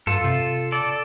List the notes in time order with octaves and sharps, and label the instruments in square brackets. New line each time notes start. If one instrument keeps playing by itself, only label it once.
[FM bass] G2 [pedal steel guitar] F4 A4
[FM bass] C3
[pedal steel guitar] A4 D5